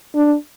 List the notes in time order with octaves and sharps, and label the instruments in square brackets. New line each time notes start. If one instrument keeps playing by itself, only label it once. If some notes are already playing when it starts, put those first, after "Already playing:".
[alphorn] D4